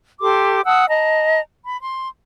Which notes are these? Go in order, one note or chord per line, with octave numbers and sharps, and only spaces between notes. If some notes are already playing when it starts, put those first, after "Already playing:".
G4 A4 C6 D6
F#5 A5 D#6 E6
D#5 A5 A#5
B5
C6